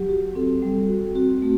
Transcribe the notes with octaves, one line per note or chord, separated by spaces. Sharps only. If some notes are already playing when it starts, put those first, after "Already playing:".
Already playing: F#3 G4
F#4
C4 A4
G3
F#4
C4 F#4
A3